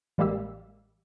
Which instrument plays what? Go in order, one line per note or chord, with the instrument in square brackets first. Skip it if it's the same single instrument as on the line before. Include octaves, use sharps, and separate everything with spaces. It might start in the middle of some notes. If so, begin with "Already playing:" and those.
[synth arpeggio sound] A1 G3 G#3 A#3 G4 E6